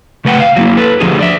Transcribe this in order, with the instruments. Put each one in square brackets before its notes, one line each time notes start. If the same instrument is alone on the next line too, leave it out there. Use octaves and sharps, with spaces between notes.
[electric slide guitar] C#3 A3 B4 D5 F#5 G5
F5
F#3 A#3 E4
A4 B4
D3 F3 A3 D4 G4 G#4
D5 E5